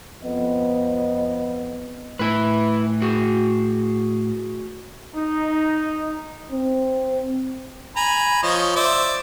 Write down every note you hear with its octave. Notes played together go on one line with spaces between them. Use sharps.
F2 B3 D#5
A2 E4 B4
F#4 G#4
D#4
C4
G#5 A#5 B5
F3 C#5 D#5
C5 D5 E5